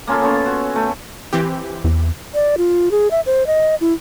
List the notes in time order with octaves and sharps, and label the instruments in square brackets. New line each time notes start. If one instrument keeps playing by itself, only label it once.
[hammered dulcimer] A#3 C#4 F4 A4
B3 C#4 C#5
F#4
A3
[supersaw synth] E3 C4 G4
[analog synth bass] E2
[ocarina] D5
F4
G#4
E5
C5
D#5
E4